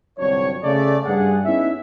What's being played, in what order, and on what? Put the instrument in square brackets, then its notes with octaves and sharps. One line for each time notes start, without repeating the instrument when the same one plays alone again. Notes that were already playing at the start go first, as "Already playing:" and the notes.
[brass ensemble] G1 C2 F#3 C4 D4 C#5
C#3 A3 D5
G2 G#4 F#5
B3 C#4 D#4 E4 E5